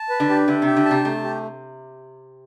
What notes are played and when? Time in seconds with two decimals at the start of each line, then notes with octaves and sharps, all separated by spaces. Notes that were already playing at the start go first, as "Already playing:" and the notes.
Already playing: A5
0.10 B4
0.20 D3
0.29 G4
0.48 D3 E5
0.62 C3 G4
0.76 D3
0.85 A5
0.91 C3
1.05 C3 A3
1.24 G4